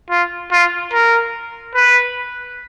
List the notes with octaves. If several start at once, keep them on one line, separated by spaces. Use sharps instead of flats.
F4
F4
A#4
B4